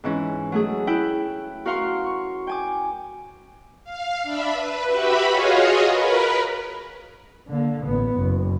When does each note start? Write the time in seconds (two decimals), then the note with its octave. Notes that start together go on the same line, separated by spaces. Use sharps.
0.04 G#2 E3 C#4
0.52 F#3 A3 G#4
0.87 E4 G5 F#6
1.65 F#4 A#4 F5 C6 C#6
2.07 C#6
2.47 G5 G#5 D6
3.84 F5
4.23 D4 E5 B5
4.53 B4
4.86 F#4 G4 B4 E5 B5
5.29 F4 F#4 G#4 C#5 D#5 F5
5.90 A#4 B4 B5
7.48 D3 A#3
7.85 A1 B3
8.17 F#1